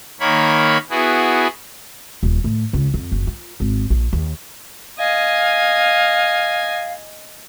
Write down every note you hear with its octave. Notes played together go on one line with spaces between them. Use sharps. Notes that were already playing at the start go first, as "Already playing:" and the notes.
D#3 A#3 C#5 B5
B3 E4 F#4 G#4
D#1
A2
C#2
F2
F#1
F4
G#1
A#1
D#2
D#5 F5 G#5